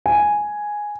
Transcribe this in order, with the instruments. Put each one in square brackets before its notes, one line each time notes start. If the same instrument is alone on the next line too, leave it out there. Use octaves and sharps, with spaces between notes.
[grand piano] G#5